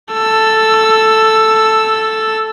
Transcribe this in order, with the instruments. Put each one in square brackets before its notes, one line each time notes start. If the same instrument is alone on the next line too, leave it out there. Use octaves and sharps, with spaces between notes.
[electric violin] A4 E6